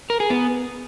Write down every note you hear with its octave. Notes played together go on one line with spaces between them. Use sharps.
A#4
G#4
B3